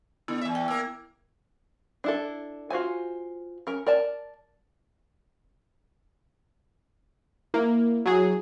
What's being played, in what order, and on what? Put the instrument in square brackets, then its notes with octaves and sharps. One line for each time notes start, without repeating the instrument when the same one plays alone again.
[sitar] D3 [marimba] B3 E4
[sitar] E2 E5
[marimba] G5
[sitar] A#3 A#4 [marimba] E6
[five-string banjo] D4 E4 A4
F4 F#4 C5 G#5
C#4 A#4
A#4 D5 A5
[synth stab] A#3 [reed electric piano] E4
[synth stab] F#3 G#4